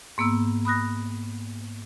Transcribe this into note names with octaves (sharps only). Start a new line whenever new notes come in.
G#2 A#3 B3 E6
B5 D#6 F#6 A#6